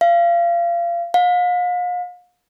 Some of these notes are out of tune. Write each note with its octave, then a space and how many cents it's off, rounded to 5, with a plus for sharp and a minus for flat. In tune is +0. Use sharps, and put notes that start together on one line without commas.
F5 -30
F5 +40